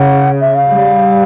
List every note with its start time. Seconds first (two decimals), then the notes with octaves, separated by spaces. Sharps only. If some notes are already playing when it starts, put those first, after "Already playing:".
Already playing: C#3 F#5
0.41 E5
0.54 F5
0.68 G3